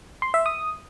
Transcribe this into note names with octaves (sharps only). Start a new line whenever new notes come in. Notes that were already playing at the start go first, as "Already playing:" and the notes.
C6
E5
D#6